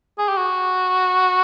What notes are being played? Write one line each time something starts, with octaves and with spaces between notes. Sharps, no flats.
G#4
G4
F#4